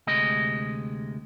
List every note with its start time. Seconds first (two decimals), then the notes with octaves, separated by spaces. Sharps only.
0.07 D2 C3 G#3 D#5